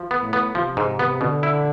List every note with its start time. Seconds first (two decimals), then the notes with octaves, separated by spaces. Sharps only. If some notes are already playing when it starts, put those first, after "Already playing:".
Already playing: F3
0.11 B3
0.22 A2
0.33 B3
0.55 C3 F3
0.77 G#2
0.99 B3
1.21 B2 D3
1.43 E4